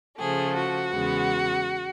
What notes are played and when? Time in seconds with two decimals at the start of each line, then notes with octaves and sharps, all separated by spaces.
0.17 C#3 F3 A3 G#4
0.55 F#4
0.91 E2 C#3 E3 G#3 B3